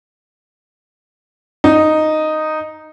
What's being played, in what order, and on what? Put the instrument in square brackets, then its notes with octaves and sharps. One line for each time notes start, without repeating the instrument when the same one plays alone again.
[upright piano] D#4